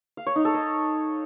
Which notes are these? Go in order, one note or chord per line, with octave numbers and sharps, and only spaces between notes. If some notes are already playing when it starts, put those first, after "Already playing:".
F5
C#5
D#4
A4
D#5